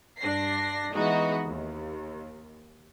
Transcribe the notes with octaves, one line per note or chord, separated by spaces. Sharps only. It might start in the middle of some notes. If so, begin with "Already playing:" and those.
G2 D4 A#6 C7
E3 G#3 B3 D#4 F#4 D#5
D#2